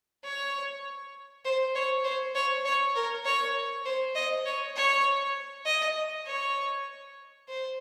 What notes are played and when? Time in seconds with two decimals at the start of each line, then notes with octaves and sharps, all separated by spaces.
0.24 C#5
1.45 C5
1.75 C#5
2.04 C5
2.35 C#5
2.65 C#5
2.96 A#4
3.25 C#5
3.85 C5
4.15 D#5
4.46 C#5
4.76 C#5
5.66 D#5
6.27 C#5
7.48 C5